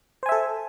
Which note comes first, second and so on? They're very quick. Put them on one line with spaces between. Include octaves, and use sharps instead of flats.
C5 G#5 E5 A4